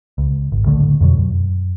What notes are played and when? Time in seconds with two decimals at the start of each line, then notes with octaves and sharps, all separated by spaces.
0.18 C#2
0.52 G#1
0.66 C#2 A2 D3 A3
1.01 F2 B2 F#3
1.18 F#2